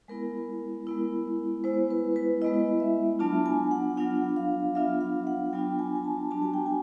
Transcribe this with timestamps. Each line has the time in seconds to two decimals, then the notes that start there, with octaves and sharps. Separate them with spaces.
0.08 G#3 B3 E4 A#4
0.87 G#3 B3 E4 A#4
1.64 G#3 B3 E4 C5
1.91 B4
2.16 B4
2.42 G#3 B3 E4 D#5
2.80 E5
3.19 F#3 B3 D4 F4 A5
3.46 G#5
3.71 F#5
3.97 F#3 B3 D4 F4 F#5
4.36 F5
4.75 F#3 B3 D4 F4 E5
5.01 F5
5.27 F#5
5.53 F#3 B3 D4 F4 G5
5.79 G#5
5.95 G#5
6.04 A5
6.31 G3 B3 D4 F#4 A5
6.42 G#5
6.54 G5
6.66 G#5